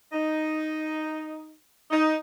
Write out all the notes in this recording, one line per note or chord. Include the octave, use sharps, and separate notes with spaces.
D#4
D#4